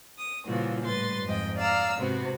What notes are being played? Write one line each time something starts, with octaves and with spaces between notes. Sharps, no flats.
D#6
A#2 C#3 E3 F3 G3 F#4
A2 G3 B4 C6 A6
F2 G#2 D#5 G5
D5 F5 A#5 E6
G#2 C3 B3 C4 F#4